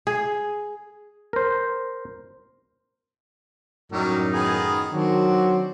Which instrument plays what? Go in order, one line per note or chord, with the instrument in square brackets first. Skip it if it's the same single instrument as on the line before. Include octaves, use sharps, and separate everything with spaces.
[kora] G#4
[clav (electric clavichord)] A#4 C5
[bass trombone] F#2 [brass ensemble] A2 D#4 [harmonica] F#3 G3 A#4
[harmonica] D#3 B3 G#4
[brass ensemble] D#3 F#4 [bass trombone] F#3 [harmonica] C4 D4